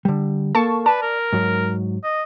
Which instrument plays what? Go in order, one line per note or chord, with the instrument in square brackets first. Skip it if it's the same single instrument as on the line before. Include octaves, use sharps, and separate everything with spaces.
[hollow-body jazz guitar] D3 G3
[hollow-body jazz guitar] A#3 A4 [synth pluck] A5 C#6
[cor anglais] B4 [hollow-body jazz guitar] D5 [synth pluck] A5
[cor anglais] A#4
[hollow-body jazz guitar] G#2 F#3
[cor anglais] D#5